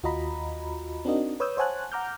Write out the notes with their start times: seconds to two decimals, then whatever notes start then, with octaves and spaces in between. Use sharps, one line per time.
0.03 D#2 F4 F#4 D#5 A#5 B5
1.05 C4 D4 D#4 F#4 A#4 D#5
1.40 B4 C#5 D#6 E6 G6
1.57 C5 C#5 F#5 G#5 A5 F#6
1.92 F#5 A#5 D6 F6 G6